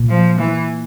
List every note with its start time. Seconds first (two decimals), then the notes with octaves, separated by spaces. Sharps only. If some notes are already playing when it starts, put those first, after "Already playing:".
Already playing: A#2
0.09 F3
0.40 E3